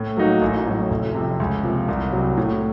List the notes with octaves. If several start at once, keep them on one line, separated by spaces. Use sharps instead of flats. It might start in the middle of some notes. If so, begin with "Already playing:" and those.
Already playing: A2
F#3 A#3 D#4 F#4
A1
A2 F#3
F1
F2 C3
C#2
C3 F3 A#3
C2
C3 F#3
A2